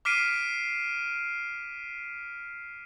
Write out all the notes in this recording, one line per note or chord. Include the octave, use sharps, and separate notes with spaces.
D6 F6 B6 C7 D7 D#7